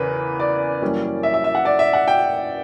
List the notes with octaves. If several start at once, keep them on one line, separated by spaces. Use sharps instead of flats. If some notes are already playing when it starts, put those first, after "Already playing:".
Already playing: E2 C#3 E3 A#4 B4
D5
F#2 E3 G3 A#3 C#4
E5
E5
E5
F#5
D5
E5
F#5
G5